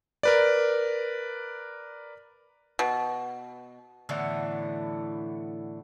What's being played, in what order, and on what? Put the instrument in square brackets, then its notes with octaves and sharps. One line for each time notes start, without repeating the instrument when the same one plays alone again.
[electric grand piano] A#4 B4 D5
[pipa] B2
[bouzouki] A2 D3 E3 B3